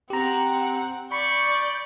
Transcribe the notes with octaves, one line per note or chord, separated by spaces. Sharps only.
C4 G4 F#5 A#5
D5 B5 C#6 G6